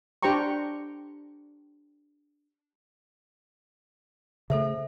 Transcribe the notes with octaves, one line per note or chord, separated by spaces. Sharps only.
D4 G4 C5 G5 A#5 C#6
C#3 A3 A4 C5 E5